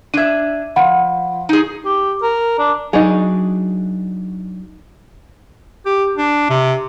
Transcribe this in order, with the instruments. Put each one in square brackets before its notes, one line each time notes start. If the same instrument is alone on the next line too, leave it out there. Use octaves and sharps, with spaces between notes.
[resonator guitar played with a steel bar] D4 E5 [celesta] G#6 D#7
[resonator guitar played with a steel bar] F3 [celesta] F#5 B5
[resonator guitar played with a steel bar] D#4 G#4
[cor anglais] G4
A#4
D4
[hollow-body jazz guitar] F#3 D4 [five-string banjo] D#4 F#4 G#4
[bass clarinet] G4
D4
C3